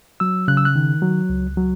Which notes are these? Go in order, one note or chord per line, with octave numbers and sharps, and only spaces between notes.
F#3 E6
C#3 F#6
E6
F#6
D#3
F#3
C#2
F#3